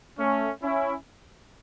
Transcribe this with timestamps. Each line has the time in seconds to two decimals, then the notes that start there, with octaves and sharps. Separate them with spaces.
0.18 A3 C#4
0.62 C#4 E4